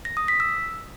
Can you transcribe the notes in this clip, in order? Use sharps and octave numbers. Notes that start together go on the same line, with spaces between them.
A#6
D#6
B6
E6